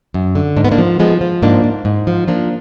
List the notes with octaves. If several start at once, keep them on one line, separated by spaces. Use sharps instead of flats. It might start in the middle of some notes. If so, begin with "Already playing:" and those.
F#2
D3
G#2 D4
B3
A#3 D4
F3
F3 G#3 B3
F3
G#2 A#3 D4
G#2
G#2
F3
F3 A#3 D4